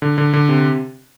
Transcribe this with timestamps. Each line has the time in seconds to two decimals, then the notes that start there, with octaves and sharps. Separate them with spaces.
0.02 D3
0.18 D3
0.33 D3
0.49 C3